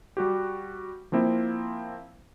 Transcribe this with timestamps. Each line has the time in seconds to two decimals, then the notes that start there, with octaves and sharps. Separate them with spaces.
0.17 G3 F#4 G4
1.12 F3 A#3 C4 E4